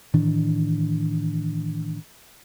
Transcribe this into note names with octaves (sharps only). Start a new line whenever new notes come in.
A2 D#3 E3 D4